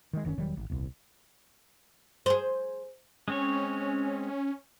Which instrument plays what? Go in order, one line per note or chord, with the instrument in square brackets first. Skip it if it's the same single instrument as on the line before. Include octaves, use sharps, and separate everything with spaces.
[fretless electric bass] D#3 G#3
F#1 D#3 C4 C#4
E1 D#3 F#3 G3
G#1
D#1 C2
[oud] G#4 C5
[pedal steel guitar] G#3 C4 C#5 [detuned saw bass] C#4